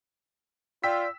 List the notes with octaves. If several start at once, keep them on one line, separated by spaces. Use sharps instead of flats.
F4 D5 G5 E6 B6